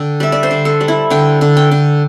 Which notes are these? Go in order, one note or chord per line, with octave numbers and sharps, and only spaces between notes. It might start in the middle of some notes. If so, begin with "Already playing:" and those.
Already playing: D3 G5
G3 E5
D5
C5
D3
A4
G3
E4
D3 G5
D3
G5
D3